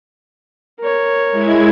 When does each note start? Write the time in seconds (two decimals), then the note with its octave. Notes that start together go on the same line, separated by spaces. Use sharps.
0.80 A#4 C#5
1.31 G#3 E4 G#6